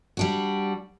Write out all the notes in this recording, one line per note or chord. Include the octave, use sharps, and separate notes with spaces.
G3 D4 F#4